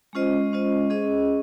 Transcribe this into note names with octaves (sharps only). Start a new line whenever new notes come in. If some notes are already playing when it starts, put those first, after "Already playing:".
G#3 C#4 F4 C5 D#5
G#3 C#4 F4 C5 D#5
C#4 G#4 D#5